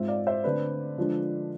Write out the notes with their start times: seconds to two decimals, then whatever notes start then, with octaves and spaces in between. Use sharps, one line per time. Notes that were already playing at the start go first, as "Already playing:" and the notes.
Already playing: G#2 G#3 C4 F4 C5 E5
0.08 D5 F5
0.27 C5 E5
0.44 D3 A3 C4 B4 D5
0.98 D3 F3 G#3 D4 F4